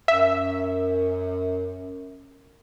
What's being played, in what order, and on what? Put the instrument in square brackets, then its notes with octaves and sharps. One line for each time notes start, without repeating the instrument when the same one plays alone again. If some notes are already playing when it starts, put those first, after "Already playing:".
[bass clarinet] F#2 [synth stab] E5